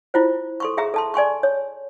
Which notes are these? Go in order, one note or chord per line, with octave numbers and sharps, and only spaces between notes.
E4 F4 C5
A4 C6 C#6
G#4 E5 A#5
A4 A5 C6
D5 G#5 C6 C#6
C#5